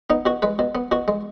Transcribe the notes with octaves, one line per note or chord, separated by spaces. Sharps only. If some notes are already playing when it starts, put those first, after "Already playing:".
B3 D#4
B2 F#4
G#3 B4
B2
B3
B2 F#4
G#3